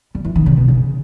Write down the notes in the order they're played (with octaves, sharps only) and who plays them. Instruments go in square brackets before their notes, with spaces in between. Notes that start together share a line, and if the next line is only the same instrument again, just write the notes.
[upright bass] G3
E3
D#3
B2
C#3
B2
C#3